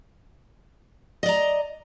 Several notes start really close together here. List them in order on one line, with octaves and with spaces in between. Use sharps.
D#5 D5 A#5